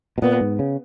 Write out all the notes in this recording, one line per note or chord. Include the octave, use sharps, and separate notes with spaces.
B2
A#2 B3
G#2
C#3